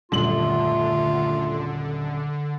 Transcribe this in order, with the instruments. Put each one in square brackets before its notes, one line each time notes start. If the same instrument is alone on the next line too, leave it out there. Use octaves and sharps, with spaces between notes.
[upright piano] D#1 F#2 F#7 [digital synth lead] D3 [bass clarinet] A3 [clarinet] F4